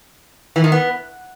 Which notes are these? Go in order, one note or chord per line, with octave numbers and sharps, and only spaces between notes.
E3
D#3
B3